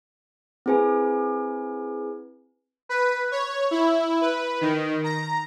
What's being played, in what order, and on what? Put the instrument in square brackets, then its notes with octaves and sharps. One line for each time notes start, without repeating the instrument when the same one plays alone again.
[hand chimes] C4 E4 G#4 B4 G#5
[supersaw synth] B4
C#5
E4
B4
D#3
A#5